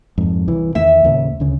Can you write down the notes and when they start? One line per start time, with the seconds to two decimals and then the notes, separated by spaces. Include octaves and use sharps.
0.18 F2 G#2
0.48 C2 E3
0.75 E2 D#3 A3 E5
1.04 D#2 A2 C#3
1.40 D2 C#3